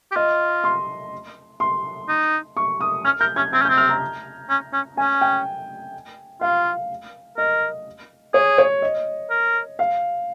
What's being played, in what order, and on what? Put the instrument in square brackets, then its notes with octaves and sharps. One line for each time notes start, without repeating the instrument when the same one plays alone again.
[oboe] G4
[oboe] F4 [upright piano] D#5
[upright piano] C6
C6
[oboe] D#4
[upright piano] C#6
D#6
[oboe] C#4 [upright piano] F6
[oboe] A#4 [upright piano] G6
[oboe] C#4 [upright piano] G#6
[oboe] C4 [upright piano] G#6
[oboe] C#4
[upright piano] G6
[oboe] C4
[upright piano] F6
A#5
[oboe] C#4
C#4
[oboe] C#4 [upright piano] G#5
[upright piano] G5
[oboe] F4 [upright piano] F5
[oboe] A#4 [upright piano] D#5
[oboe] G#4 [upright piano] C#5
[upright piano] C#5
D#5
[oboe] A#4
[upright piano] F5